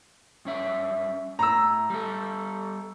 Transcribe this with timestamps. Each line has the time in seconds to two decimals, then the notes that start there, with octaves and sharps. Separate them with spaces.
0.45 G2 C#4 E5
1.39 A2 A#5 E6
1.90 G3 A4